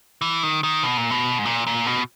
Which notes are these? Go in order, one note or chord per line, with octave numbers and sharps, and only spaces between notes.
E3
D#3
D#3
B2
A#2
B2
G#2
A#2
A#2
B2